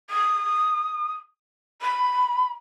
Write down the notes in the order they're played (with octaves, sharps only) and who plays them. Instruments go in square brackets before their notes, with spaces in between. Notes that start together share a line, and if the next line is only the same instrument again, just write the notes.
[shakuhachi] D#6
B5